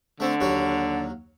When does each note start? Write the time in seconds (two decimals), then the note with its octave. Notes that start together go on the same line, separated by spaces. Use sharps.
0.20 D3 A3 C4
0.40 D#2 F#3 C#5